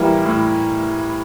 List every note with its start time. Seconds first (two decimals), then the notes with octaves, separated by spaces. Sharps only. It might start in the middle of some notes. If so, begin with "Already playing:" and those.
Already playing: A2 E3 G3 A#3 E4
0.26 A2